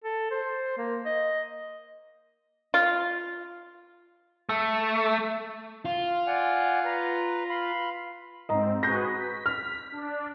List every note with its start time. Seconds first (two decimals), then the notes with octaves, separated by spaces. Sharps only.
0.04 A4
0.31 C5
0.78 A#3
1.06 D#5
2.74 F4
4.49 A3
5.85 F4
6.27 D5 F#5 G#5
6.85 B4 A#5
7.50 F5 B5 C6
8.49 G#2 C4 D#5 A#5
8.83 F#4 G#4 B4 G6 A#6
9.14 B6
9.46 F6
9.92 D4